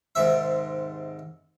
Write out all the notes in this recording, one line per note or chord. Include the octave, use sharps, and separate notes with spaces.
D#2 G#2 C3 E5